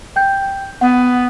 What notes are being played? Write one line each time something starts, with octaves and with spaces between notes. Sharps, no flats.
G5 G6
B3 F#5